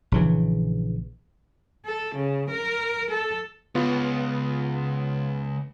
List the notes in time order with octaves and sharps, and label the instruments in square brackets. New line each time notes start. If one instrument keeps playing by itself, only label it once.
[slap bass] A#1 C#3 E3
[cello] A4
C#3
A#4
A4
[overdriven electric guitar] C#2 [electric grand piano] B3 F4